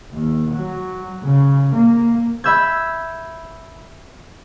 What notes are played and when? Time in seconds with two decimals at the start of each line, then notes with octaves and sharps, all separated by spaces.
0.12 D#2
0.54 F#3
1.22 C#3
1.73 A#3
2.44 E5 B5 E6 G6 G#6